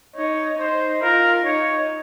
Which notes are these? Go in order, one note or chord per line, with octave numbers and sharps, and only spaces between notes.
D#4 C#5
D#4 C5
F4 A#4
D#4 C#5